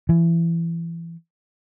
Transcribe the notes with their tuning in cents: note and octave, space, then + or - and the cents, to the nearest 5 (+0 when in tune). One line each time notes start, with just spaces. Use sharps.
E3 +25